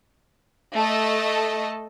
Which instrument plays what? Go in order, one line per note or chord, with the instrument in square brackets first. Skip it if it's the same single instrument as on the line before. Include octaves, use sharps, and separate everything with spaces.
[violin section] A3 A4 D#5